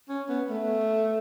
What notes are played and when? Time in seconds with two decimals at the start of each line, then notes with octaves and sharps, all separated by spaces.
0.09 C#4
0.29 B3
0.50 A3